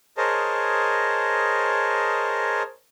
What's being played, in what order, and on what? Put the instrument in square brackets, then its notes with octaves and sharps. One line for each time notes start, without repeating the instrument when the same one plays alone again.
[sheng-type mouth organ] G#4 A#4 C5 C#5 D#5 A5